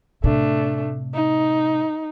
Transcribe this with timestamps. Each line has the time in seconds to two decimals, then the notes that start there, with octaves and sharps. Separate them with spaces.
0.24 A2 C3 A3 D4
1.14 D#4